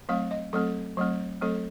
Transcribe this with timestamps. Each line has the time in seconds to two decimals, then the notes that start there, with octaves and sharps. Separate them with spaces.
0.09 F#3 A3 C4 F5
0.31 D#5
0.53 F#3 A3 C4 A4
0.97 F#3 A3 C4
1.41 F#3 A3 C4 A4